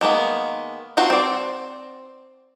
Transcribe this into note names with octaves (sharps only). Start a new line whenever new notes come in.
D#3 G#3 A#3 B3
C4 F4 F#4 C5
C4 D5